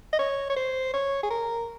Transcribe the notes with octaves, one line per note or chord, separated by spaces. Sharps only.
D#5
C#5
C#5
C5
C#5
G#4
A#4